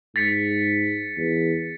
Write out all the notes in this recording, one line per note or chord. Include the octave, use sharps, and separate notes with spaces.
G#2 A6 B6 C#7
E2